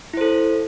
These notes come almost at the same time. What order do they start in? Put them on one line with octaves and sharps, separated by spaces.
E4 C5 A4